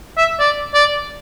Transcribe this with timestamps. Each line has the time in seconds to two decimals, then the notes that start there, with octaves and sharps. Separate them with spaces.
0.18 E5
0.40 D5
0.74 D5